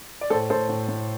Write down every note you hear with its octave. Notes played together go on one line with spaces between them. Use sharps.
D5
A2 A4 C5
A2 A4 C5
A2
A2